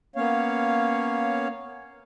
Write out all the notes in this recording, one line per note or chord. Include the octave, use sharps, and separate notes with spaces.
A#3 B3 C#4 C#5 F5